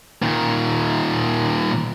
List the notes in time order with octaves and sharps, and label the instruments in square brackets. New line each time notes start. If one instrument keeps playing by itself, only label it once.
[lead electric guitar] A#2 D#3